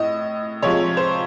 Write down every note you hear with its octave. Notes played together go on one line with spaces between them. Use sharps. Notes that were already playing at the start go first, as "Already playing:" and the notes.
Already playing: A2 D#5
C3 F3 G#3 C#5
C5